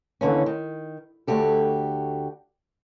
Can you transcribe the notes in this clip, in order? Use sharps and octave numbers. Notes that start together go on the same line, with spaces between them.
D#2 D3 E3 C#4
D#3
D2 F#4 G4 A4